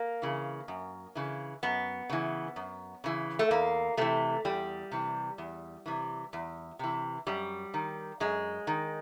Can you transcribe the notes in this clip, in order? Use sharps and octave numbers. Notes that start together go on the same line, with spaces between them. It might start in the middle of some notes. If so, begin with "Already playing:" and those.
Already playing: A#3
C#3 E3
F#2
C#3 E3
F#2 B3
C#3 E3
F#2
C#3 E3
A3
E2 A#3
C3 E3 A3
E2 G3
C3 E3
E2
C3 E3
E2
C3 E3
F#2 G3
D#3
F#2 G#3
D#3